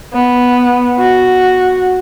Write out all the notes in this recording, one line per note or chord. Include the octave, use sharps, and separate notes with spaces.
B3
F#4